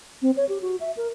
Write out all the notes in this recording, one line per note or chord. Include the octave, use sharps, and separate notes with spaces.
C4
C#5
G4
F#4
E5
A#4